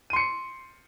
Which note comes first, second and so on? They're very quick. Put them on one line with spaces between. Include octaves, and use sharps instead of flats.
D#7 C6 C#7 C7